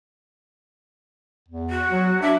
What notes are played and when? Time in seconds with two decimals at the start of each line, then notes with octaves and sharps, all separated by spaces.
1.49 E2
1.70 F#4
1.91 F#3
2.22 D4 E5